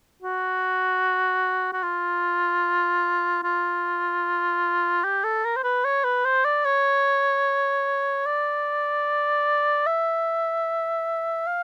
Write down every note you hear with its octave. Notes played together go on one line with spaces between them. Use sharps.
F#4
F#4
F4
F4
G4
A4
A#4
C5
B4
C#5
B4
C5
D5
C#5
D5
E5
F5